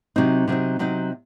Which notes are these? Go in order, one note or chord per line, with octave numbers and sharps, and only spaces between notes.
C3 F#3 C4 D#4
C3 F#3 C4 D#4
C3 F#3 C4 D#4